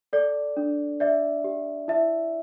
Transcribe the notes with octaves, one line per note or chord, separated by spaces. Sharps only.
A4 D5
D4
D5 E5
G4
E4 E5